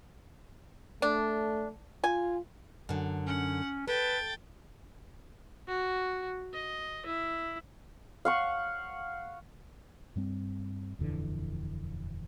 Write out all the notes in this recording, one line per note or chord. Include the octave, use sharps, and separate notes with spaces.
A3 D4
F4 G#5
F#2 D3
C#4 F#5
A4 B4 G5 A6
F#4
D#5
E4
F5 F#5 C#6
G2 G3 C4
D#1 F2 D3 E3